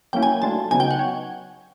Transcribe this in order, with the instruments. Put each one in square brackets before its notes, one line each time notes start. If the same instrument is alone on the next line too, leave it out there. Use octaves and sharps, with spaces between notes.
[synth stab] F#3 A#3 C#4 E4 [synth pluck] G5
[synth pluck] G#5
[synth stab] F#3 A3 D4 F4 [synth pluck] A5
[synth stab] C#3 F#3 B3 D#4 [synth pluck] G#5
[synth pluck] G5
F#5
[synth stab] C#5